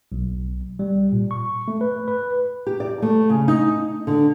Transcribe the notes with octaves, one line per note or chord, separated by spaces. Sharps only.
B1
G3
A#2
C#6
A3
B4
B4
G4
D5
A3
C#3
D#4
D3